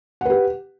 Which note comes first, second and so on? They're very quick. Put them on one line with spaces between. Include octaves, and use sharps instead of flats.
F#5 B4 G4